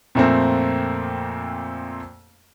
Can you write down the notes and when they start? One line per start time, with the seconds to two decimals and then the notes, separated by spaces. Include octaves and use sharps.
0.15 F2 A#2 A3 A#3 C4